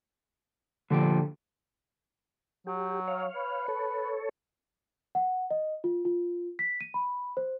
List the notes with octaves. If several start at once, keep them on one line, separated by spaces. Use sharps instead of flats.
A#2 D3 F3 G4
F#3 G4
C#5 F5
B4
A4 C#5
F#5
D#5
F4
F4
B6
D#7
B5
C5